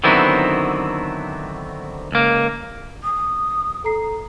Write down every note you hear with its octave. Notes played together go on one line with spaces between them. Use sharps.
D3 D#3 F#3 B3 C4 E4
C#2 A#3
D#6
A4 A#5 C7